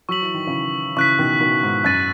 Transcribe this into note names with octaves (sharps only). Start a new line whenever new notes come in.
F#3 C#6 E6 B6 F#7
E3
D#3
C#3 E3
C#3 E3 C#6 F#6 B6
B2 D#3
B2 D#3
G#2
F#2 F#6 A6 D#7